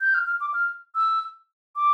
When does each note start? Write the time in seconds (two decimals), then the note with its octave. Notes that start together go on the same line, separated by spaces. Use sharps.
0.01 G6
0.14 F6
0.27 F6
0.41 D6
0.54 F6
0.95 E6
1.76 D6